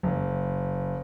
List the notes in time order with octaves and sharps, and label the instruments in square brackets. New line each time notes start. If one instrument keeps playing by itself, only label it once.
[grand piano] F#1